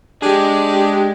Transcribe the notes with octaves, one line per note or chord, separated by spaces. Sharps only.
G#3 D4 G4 G#4